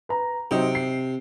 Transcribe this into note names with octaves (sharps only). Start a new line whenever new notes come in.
B4 A#5
C3 F#3 C4 D#4
C7